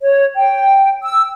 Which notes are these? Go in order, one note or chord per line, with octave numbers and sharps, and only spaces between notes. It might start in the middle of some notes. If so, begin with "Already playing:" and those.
C#5
G5
E6